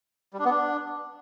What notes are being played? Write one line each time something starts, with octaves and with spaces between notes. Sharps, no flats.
G3
D4
B3
D4